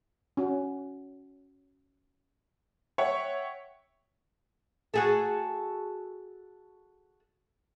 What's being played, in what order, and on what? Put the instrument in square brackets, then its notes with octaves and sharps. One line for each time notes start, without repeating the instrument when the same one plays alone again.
[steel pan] C#4 F#4
[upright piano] C#5 E5 F#5 G5 C#6
[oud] F#4 G#4 A4